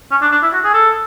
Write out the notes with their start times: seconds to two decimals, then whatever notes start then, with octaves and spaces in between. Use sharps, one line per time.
0.11 C#4
0.22 D4
0.32 D4
0.43 E4
0.53 F#4
0.64 G#4
0.74 A4